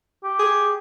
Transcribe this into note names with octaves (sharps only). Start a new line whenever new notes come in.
G4
G#4